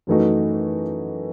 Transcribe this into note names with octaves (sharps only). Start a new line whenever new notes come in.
F#2 E3 A3 D#4 F#4